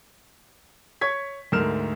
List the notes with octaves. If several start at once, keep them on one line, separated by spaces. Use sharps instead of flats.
C#5 C#6 G#6 B6
D2 G#2 A3 A#4 F6 E7